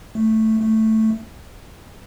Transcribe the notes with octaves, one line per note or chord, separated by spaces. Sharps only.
A3
A3